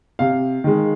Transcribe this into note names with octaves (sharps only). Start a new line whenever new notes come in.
C3 F5
D#3 G#3